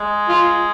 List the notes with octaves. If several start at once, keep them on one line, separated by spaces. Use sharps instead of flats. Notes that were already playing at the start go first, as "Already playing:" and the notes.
Already playing: G#3
F4